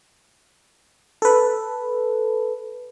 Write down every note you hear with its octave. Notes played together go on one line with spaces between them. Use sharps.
A4 B4